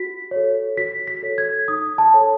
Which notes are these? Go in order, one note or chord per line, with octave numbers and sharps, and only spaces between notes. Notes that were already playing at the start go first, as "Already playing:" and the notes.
Already playing: F#4 B6
A4 C#5
F#4 B6
B6
A4 C#5
G#6
D#4 D#6
A5
A4 C#5